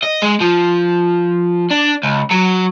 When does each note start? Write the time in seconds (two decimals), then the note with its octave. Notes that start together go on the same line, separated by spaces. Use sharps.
0.03 D#5
0.22 G#3
0.40 F3
1.71 D4
2.03 C#2
2.31 F#3